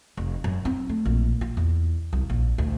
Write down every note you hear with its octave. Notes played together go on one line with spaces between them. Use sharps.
F1
F#2
C4
A3
A#1
F4
E2
C2
A#1
D2